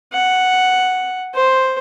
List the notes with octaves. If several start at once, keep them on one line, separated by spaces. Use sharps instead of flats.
F#5
C5